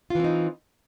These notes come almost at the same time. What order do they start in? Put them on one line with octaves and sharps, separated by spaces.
F4 E3 C4 D#4